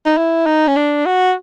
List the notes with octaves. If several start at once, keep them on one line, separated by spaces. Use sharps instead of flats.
D#4
E4
D#4
C#4
D4
F#4